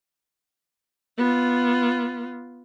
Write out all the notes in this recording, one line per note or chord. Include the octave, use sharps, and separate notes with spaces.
B3 F4